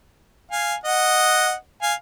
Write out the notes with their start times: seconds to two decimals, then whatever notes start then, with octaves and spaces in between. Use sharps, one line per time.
0.51 F5 G#5
0.84 D#5 F#5
1.82 F5 G#5